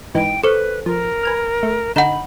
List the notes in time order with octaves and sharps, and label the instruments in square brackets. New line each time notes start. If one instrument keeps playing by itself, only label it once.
[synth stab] G#2 E3 D#4 [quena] G5
[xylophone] A4 C5 [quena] B4 [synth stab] C#6
[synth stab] F3 [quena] A#4
[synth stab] B4 G#5 F6
A3
[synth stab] D3 D#4 G6 [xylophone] F#5 E7 [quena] B5